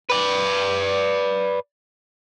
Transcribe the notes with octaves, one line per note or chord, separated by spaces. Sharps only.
B4 D5